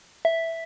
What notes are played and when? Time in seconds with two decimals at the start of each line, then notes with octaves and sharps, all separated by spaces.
0.25 E5